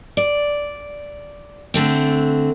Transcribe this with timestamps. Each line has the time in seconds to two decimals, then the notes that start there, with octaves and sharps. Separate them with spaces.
0.17 D5
1.74 D3 A3 C4